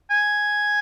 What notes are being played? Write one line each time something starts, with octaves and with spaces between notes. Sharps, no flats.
G#5